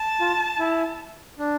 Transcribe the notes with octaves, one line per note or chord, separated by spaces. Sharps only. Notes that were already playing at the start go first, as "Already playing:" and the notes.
Already playing: A5
F4
E4
D4